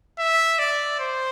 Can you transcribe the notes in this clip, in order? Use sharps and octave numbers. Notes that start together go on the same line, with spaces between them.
E5
D5
C5